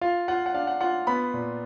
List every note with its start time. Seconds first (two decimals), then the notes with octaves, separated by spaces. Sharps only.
0.01 F4 F5
0.28 F4 F#5
0.46 F#5
0.54 D4 F5
0.67 F#5
0.81 F4 F#5
1.07 B3 B5
1.34 A#2